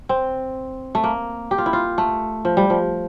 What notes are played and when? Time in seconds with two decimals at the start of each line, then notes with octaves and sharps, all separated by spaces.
0.09 C4
0.95 A3
1.04 A#3
1.51 G4
1.58 F4
1.66 E4
1.73 F4
1.98 A3
2.45 F3
2.57 G3
2.70 F3